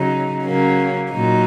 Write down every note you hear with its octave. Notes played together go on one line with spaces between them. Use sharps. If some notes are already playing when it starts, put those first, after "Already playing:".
Already playing: C#3 F#3 D#4
C#3 F#3 A#3 C#4
A#2 F#3 D#4